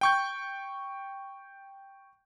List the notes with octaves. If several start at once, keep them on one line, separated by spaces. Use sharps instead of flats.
G5 C#6 G6